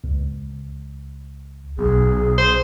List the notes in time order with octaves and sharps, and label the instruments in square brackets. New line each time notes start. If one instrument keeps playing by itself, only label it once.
[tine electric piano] C#2
[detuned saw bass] B1 [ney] G#4
[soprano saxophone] C5